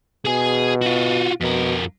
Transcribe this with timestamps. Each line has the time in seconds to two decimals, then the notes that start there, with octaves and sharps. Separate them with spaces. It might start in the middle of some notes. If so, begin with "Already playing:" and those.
0.25 B2 G#4 G#5
0.82 F4 F#4
1.41 F2 B2 A#4